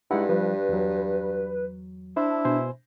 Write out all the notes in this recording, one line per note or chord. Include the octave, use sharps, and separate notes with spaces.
G2 G#3 D#4 E4 F#5
F3 G3 B4
E2 F#3
D4 E4 C5
B2 C5 G#5